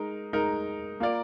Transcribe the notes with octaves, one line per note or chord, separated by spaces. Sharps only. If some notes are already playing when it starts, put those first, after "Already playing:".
Already playing: G#3 D#4 A#4
G#3 D#4 A#4
A#3 F4 A#4 D5